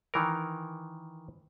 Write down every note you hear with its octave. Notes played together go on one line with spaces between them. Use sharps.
D#3 E3 A#4